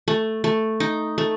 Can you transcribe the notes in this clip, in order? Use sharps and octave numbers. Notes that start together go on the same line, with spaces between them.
A3
A3
D#4
A3